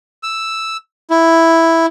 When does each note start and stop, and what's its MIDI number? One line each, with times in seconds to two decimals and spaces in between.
0.23 0.77 88
1.10 1.86 64